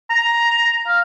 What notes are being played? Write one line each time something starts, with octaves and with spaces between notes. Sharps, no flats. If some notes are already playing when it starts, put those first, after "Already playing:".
A#5
F5